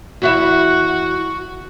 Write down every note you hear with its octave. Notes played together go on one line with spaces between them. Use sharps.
E2 E4 F#4 E5